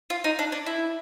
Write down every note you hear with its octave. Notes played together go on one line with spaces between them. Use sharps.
F4
D#4
D4
D4
E4